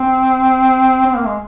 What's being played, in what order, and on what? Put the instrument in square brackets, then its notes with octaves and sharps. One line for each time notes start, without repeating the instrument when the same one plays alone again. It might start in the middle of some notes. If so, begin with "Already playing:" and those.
Already playing: [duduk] C4
C4
A#3
G#3